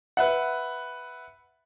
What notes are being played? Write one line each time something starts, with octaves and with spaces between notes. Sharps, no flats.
B4 E5 F#5